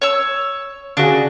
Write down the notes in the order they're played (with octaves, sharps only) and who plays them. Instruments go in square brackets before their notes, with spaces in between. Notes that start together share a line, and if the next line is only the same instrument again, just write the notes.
[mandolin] C#5 E6
[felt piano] C#3 F#4 G#4 [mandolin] D4